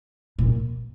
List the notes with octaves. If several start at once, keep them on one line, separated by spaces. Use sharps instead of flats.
A#2